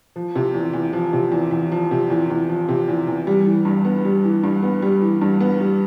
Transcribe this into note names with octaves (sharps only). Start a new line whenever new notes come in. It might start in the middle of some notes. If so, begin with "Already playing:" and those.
F3
C3
E2
E2
F3
C3
E2
E2
F3
C3
E2
E2
F3
C3
E2
E2
G3
E3
G2
B3
G3
E3
G2
B3
G3
E3
G2
B3
G3